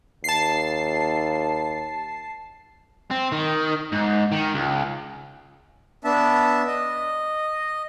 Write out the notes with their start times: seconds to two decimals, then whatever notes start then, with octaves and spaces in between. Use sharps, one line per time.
0.24 D#2 A5 C7
3.11 C4
3.33 D#3
3.92 G#2
4.32 D#3
4.54 C#2
6.04 B3 D4 E5 A5
6.67 D#5